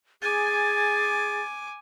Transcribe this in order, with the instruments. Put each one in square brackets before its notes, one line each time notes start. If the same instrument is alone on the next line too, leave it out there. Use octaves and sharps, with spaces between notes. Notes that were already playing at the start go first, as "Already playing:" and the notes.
[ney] G#4 [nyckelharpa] G#5 D6 [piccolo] A6